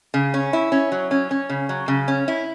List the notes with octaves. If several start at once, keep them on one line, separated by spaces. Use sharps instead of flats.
C#3
C#4
E4
C#4
F#3
C#4
C#4
C#3
F#3
C#3
C#4
E4